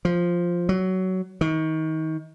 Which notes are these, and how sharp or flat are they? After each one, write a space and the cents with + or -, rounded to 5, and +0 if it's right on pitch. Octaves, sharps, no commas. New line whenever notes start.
F3 +0
F#3 +15
D#3 +30